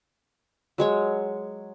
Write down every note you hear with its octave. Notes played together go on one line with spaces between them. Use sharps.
F#3 G#3 C#5